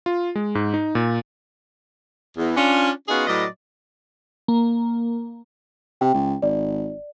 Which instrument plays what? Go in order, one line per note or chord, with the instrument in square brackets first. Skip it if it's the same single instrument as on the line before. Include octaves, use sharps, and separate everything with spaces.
[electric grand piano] F4
G#3
G#2
D#4
A#2
[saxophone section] E2
C#4 D4 F4
B3 C#4 D#4 F4 F#4 G#4
A2 F#3 B4 D5 D#5
[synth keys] A#3
[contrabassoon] C3 [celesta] G5
[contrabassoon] C#2
[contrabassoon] G#1 [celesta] D5